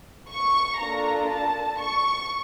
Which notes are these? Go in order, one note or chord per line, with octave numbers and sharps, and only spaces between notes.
C#6
A#3 D4 F4 A4 A#5
A5
C#6